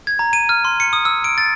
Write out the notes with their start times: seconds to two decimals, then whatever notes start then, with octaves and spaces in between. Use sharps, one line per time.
0.07 G#6
0.19 A#5
0.33 D#7
0.49 F6
0.65 C6
0.80 C#7
0.93 D#6
1.05 E6
1.24 D7
1.38 A6